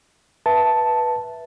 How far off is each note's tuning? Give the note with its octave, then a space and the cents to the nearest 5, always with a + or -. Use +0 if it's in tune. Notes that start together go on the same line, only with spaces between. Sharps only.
B4 -10 E5 +0 A5 +0